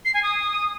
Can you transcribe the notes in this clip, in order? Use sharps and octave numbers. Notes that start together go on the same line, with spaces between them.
C7
G#5
D#6